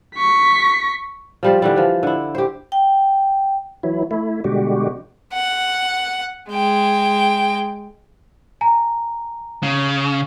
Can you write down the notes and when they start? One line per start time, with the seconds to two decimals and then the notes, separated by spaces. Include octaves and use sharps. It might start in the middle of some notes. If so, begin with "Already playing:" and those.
0.16 C#6 B6
1.43 F3 G3 C5
1.62 D3 E3 G3
1.76 E3 F3
2.03 D3 E4
2.35 G4 C5
2.72 G5
3.83 E3 F#3 E4
4.11 A3 E4
4.44 B2 D3 G3 G#3 F#4 G4
5.33 F#5
6.50 G#3 G5
8.61 G#5 A#5
9.63 C#3